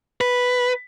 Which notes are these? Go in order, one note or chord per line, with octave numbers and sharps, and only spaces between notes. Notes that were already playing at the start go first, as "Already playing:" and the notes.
B4